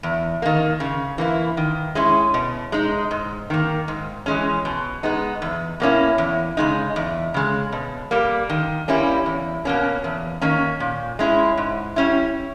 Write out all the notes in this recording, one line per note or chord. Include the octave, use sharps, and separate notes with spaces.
E2
D#3 A#3
C#3
E3 A#3 E4
D#3
G#3 C#4 E4
B2
G#3 D#4
G#2
D#3 A#3
G#2
E3 G#3 C#4
B2
G#3 B3 D#4
E2
B2 A#3 C#4 E4
E2
C#3 G#3 D#4
E2
C#3 G#3
B2
G3 A#3
D#3
G3 A#3 C#4 E4
E2
B2 A#3 C#4
E2
D#3 A#3 C#4
A#2
G#3 C#4 E4
G#2
G3 C#4 E4